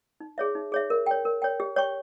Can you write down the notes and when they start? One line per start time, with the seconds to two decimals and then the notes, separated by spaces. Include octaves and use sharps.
0.20 D#4
0.38 G#4 C#5 E5
0.55 D#4
0.72 G#4 C#5 E5
0.90 A#4
1.06 C#5 G5
1.25 A#4
1.42 C#5 G5
1.60 G4
1.76 C#5 G5 C#6